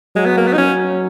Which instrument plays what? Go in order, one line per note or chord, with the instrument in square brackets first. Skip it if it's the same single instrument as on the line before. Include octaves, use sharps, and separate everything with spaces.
[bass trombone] F#3 [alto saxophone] G#3
[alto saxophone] B3
A#3
B3
D#4
[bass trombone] F#3 [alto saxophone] C#4